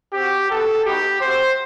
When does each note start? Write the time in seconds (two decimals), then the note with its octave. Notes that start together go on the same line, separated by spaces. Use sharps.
0.13 C4 F#4 G4
0.49 B3 F#4 A4
0.85 G3 B3 D#4 F#4 G4
1.22 A3 C4 F#4 C5